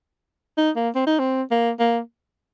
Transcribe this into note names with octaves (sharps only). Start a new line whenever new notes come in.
D#4
A#3
C4
D#4
C4
A#3
A#3